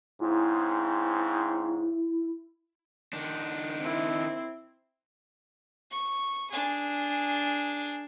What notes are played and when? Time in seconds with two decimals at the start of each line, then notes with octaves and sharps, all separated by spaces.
0.21 G#2 C#3 C4 E4
3.13 D#3 D4
3.81 C4 E4
5.91 C#6
6.51 D4 G#4